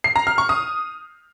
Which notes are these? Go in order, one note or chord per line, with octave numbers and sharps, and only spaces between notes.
C7
A#5
F6
C#6
D#6